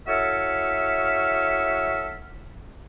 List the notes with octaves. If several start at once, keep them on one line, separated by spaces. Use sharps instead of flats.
E4 F#4 A4 C#5 E5 F5